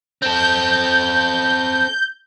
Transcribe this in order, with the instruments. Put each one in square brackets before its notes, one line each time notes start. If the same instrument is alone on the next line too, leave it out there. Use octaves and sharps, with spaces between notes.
[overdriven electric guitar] C4 A4 [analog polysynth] G6